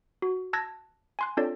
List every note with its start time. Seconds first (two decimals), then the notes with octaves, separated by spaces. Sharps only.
0.22 F#4
0.53 A5 E6 F#6 G#6 A#6
1.19 G#5 C6 F#6
1.37 C4 D4 F4 A4 C#5 D5